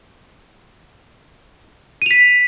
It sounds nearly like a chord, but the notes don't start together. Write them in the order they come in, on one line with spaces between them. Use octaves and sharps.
D#7 F7 B6